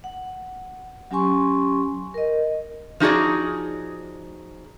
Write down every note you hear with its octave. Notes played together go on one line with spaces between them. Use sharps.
F#5
F#3 C#4 G4 G#5 C6 C#6
A#4 D#5
F3 D#4 F#4 G#4 D5